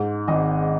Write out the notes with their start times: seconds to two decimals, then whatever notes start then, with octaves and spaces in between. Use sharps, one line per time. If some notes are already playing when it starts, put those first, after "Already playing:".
Already playing: G#2
0.28 G#1 D#5